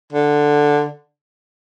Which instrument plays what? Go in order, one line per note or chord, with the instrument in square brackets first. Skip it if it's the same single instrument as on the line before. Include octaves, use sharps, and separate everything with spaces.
[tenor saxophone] D3